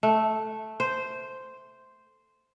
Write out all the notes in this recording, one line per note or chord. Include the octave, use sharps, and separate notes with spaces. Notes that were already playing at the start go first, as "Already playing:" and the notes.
A3
C5